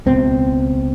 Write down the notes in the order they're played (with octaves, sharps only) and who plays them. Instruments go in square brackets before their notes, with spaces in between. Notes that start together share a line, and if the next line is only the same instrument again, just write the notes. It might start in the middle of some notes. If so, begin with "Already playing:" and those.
[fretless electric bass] C#2 B2 C4